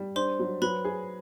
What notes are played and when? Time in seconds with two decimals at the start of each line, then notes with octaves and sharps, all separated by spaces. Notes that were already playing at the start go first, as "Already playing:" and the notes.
Already playing: G3
0.15 D4 C5 C6
0.39 F#3
0.62 F#3 B4 B5
0.84 G#4